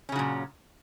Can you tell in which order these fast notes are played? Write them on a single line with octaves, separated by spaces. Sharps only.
C#4 C#3 F#3 A#2